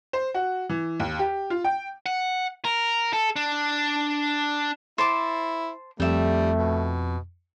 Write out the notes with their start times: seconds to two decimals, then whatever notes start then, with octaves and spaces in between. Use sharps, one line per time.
0.13 C5
0.34 F#4
0.69 E3
1.00 D#2
1.19 G4
1.50 F4
1.64 G5
2.06 F#5
2.65 A#4
3.13 A4
3.36 D4
4.98 E4 C5 A5 D6
6.00 F2 G3 A3 E5 G5
6.58 B2